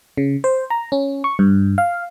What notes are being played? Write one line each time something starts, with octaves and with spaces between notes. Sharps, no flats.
C#3
C5
A#5
C#4
C#6
G2
F5